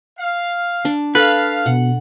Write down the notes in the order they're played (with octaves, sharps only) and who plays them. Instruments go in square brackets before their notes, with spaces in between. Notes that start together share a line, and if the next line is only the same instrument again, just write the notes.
[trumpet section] F5
[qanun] D4
[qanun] A4 [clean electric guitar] B4 [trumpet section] F5
[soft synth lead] B2 [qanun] F#5